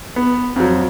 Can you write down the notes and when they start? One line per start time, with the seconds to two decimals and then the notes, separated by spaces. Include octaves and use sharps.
0.16 B3
0.56 F2 F#3